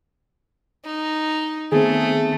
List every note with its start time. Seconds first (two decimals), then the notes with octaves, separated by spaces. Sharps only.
0.85 D#4
1.72 D#3 A3 B3 C4 G#4